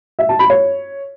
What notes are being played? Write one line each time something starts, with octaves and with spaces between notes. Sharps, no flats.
E5
A5
B5
C#5